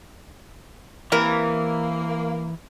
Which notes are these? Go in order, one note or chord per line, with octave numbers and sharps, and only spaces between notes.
C3 E3 A#3 E4 A#4